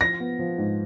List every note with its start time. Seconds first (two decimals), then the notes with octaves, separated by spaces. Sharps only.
0.01 F3 A#6
0.20 B3
0.39 F3
0.58 G#2